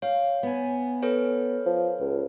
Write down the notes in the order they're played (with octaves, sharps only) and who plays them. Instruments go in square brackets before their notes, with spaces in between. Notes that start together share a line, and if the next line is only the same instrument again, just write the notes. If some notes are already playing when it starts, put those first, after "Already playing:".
[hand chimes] C#5 [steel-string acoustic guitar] F5
[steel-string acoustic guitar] B3 G#5
[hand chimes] A4 B4 C#5
[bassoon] F3
C#2